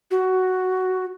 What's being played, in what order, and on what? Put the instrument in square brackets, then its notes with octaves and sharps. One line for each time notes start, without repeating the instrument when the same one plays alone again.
[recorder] F#4